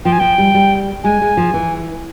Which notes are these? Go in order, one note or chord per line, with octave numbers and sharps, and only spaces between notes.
F3 G5
G#5
F3 G5
G3
G3
G#3 G#5
G#3
F3
E3